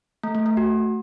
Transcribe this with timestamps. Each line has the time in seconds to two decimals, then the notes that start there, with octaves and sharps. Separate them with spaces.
0.23 A3
0.35 A3
0.46 A3
0.57 F#4